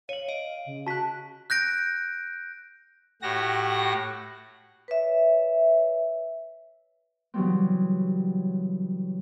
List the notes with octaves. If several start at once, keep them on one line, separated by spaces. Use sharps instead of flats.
C#5 F5 D#7 F#7
D#5 D7
C#3
F#4 A5 F#6 B6
F#6 G6 A#6 D7
A2 F#4 G4 A#6
B4 C#5 E5
C#3 E3 F#3 G3 B3 C4